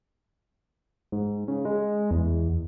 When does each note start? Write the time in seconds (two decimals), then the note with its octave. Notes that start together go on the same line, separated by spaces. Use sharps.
1.12 G#2
1.48 C#3
1.65 G#3
2.11 E2